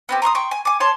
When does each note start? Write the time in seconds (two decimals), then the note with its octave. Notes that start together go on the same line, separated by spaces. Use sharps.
0.09 B3 C4 G4
0.22 A#5 C6 C#6 D#6
0.35 G5 C6 C#6
0.51 G#5
0.65 G#5 D6
0.80 C#5 A5 C6